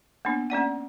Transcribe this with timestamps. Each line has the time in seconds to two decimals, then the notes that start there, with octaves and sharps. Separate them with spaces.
0.25 A#3 B3 D4
0.50 A#3 C#4 D5 F#5